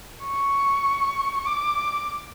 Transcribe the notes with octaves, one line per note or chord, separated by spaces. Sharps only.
C#6
D6